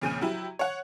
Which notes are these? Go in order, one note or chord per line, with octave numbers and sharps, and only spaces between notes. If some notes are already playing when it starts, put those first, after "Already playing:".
F2 A#2 C#3 G#5 G6 D#7
F#3 E4 G4
C#5 F#5